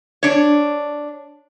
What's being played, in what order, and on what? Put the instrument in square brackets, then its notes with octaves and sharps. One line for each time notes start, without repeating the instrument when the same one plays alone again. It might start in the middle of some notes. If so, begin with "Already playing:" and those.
[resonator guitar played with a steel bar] D4 C#5